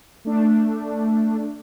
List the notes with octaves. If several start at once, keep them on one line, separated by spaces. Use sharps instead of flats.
A3 D4